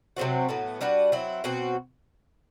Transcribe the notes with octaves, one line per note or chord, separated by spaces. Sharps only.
C3 F#3 C4 F#4
A2 F#3 B3
G3 D4 F#4 B4
F#3 C4 E4
B2 F#3 C4 F#4